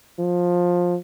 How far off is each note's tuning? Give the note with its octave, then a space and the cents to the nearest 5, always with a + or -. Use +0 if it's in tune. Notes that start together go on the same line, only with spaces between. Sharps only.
F3 +15